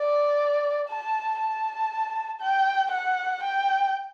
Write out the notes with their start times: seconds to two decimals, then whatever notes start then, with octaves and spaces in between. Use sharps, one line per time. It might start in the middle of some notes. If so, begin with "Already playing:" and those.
Already playing: D5
0.89 A5
1.40 A5
2.41 G5
2.92 F#5
3.43 G5